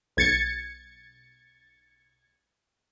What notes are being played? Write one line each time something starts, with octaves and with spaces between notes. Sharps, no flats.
B1 G#6 A6 C#7